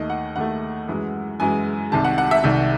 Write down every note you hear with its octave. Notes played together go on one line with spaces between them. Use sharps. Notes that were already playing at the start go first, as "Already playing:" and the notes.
Already playing: D#2 D#3 A3 D#5
F#5
D#2 D#3 A3 F#5
F#2 E3 G#3
F#2 E3 G#3 G#5
C2 C3 D#3 A5
F#5
F#5
E5
C2 C3 D#3 E5